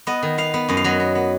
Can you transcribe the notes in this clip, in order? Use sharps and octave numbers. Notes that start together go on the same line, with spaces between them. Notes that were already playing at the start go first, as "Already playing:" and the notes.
B3 D#5
D#3
B3 F5
B3
F#2 D#5
F5
F#3 D#5
B3
B3